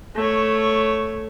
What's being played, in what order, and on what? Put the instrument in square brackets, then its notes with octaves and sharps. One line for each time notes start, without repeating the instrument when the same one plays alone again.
[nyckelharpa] A3 C#5